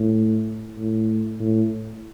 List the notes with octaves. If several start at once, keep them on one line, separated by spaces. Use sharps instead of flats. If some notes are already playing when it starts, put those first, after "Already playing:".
Already playing: A2
A2
A2